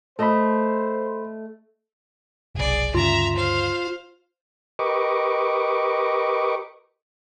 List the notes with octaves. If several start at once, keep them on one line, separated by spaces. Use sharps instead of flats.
A3 A4 C5 D#5 B5
F1 B1 G#4 D5
D2 G2 C#3 F4 E5 A#5
C5 F5
G4 A#4 B4 D#5 C#6 D6